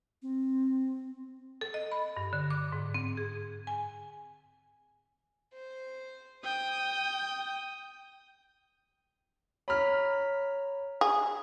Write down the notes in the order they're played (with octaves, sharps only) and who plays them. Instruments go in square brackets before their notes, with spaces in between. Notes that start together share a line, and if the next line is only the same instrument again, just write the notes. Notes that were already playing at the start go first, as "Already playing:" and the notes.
[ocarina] C4
[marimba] A4
D#5
B5
G2
D3
D6
G#2
C4
G#4
G#5
[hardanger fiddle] C5
[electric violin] G5 [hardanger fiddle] D#6
[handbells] C#5 A#5 B6 [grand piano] B5 F6
[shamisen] G#4